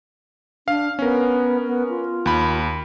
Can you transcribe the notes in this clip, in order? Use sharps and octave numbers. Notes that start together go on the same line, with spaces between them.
D4 F5
B3 C#4 A#4
B3
F4
D#2 B5